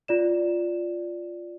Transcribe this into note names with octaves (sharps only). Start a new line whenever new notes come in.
F4 D5 E7